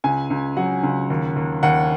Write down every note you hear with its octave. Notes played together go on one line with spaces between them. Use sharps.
C#2 G#5
C#2
F#3 F#5
C#2
D#2
D#2
D#2 F#5